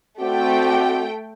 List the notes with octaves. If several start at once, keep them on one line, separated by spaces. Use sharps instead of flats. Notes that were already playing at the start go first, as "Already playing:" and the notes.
A3 C4 F#4 D5 G5